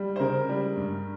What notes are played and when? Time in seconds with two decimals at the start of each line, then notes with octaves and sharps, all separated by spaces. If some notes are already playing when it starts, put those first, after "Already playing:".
Already playing: G3
0.16 C5
0.19 C#3 A#4
0.49 G3
0.76 G2